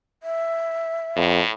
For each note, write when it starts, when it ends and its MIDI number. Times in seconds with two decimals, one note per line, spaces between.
0.23 1.23 76
1.16 1.41 41
1.16 1.50 45